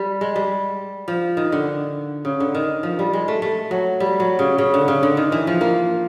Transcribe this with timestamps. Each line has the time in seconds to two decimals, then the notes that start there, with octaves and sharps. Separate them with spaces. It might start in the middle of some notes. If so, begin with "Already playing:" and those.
Already playing: G3
0.21 G#3
0.36 G3
1.08 F3
1.37 D#3
1.52 D3
2.25 C#3
2.40 D3
2.55 D#3
2.83 F3
2.99 G3
3.13 G#3
3.28 A3
3.42 A3
3.71 F#3
4.00 G3
4.20 F#3
4.39 C#3
4.58 C#3
4.74 D3
4.88 C#3
5.03 D3
5.17 D#3
5.32 E3
5.47 F3
5.61 A#3